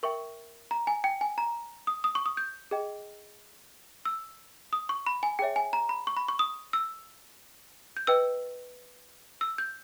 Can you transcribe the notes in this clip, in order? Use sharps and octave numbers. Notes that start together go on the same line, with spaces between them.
A#4 E5 G5 C#6
A#5
G#5
G5
G#5
A#5
D#6
D#6
C#6
D#6
G6
G#4 D#5 G5
E6
D#6
C#6
B5
G#5
G#4 C#5 E5 G5
G#5
A#5
B5
C#6
B5
C#6
D#6
E6
G6
B4 D#5 G5 E6
E6
G6